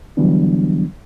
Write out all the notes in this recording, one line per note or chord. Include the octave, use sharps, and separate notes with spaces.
D3 E3 F#3 G3 B3 D4